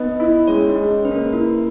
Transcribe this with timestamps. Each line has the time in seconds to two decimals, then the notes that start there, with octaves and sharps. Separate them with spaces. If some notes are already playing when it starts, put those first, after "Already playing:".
Already playing: B3 D#4 D#5
0.20 E4
0.47 G#3 C#4 C#5
0.69 D#4 D#5
0.76 G#3
0.90 C#4 C#5
1.05 C#3 B4
1.11 A#3 A#4
1.32 A#3 E4 A#4